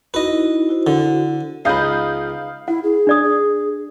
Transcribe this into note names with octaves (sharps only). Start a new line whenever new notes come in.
D#4 E4 F#4 B4 D#5
E4 F#4 C5
D3
C#2 D#4 B4 F5 D#6 G6
E4 F#5
G#4
D4 D5 D#6
G#4